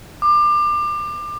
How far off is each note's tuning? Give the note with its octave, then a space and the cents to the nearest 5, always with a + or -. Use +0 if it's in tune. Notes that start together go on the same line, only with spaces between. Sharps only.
D6 +25